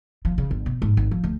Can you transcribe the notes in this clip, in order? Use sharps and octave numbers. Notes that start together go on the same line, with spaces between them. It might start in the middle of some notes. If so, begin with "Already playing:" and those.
F3
C#3
G1
B2
G#2
G#1
F3
D2